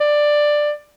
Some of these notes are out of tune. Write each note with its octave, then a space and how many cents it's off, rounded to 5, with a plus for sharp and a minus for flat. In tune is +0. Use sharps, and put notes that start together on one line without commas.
D5 +10